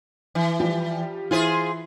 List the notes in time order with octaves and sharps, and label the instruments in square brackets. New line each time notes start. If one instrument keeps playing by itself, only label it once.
[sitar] E3
[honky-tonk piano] F3 G3 G4
[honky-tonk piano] E3 E4 [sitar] F4 G#4 C5